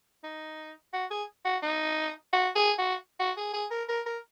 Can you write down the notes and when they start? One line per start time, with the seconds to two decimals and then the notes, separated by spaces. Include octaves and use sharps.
0.24 D#4
0.93 F#4
1.11 G#4
1.45 F#4
1.63 D#4
2.33 F#4
2.56 G#4
2.78 F#4
3.20 F#4
3.37 G#4
3.53 G#4
3.71 A#4
3.89 A#4
4.06 A#4